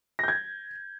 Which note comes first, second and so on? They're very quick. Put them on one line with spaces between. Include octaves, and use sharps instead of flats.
A#6 G6 G#6